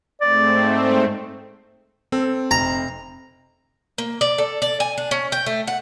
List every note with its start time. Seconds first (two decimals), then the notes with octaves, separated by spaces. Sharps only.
0.21 G#2 A3 C4 D5
2.12 C4 A4
2.51 F1 A#5
3.98 A#3
4.21 D5
4.38 A4
4.62 D5
4.80 G#5
4.98 D4
5.11 C#4
5.32 G5
5.46 A3
5.68 F#5